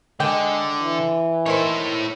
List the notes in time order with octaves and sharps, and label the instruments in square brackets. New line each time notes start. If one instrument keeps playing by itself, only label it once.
[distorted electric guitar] D3 [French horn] G#3 [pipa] G5
[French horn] E3
[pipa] D#3 C5 [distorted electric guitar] E4 C#5